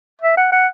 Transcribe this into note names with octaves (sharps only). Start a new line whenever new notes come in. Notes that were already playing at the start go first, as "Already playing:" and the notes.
E5
F#5
F#5